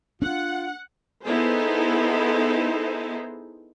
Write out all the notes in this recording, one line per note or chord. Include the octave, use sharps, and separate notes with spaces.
C#4 D4 F4 F#5
B3 D#4 E4 G#4 A4 C5